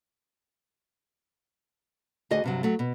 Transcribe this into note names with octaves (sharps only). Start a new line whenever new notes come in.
D2 F#4 G#4 D#5
G2 C3 F#3
F#3 A3
B2